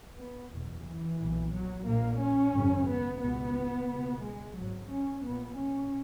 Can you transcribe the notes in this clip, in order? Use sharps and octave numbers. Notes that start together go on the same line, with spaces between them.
B3
F#1 E2 B2
E3
B1 A#2
F#3
A#1 A#2 A#3
C#4
G#1 F#2 C#3
B3
C#2 B2 B3
C#2 B2
G#3
G#1 G#2 F#3
C#4
A#1 A#2 B3
C#4